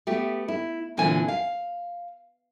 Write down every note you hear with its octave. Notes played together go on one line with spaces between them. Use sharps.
A3 B3 G4
E4
A#2 D3 E3 C4 G#5
F5